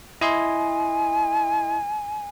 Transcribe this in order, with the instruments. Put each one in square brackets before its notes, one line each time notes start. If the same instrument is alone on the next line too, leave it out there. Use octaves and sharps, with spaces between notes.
[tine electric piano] E4 D#5 C6 [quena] G#5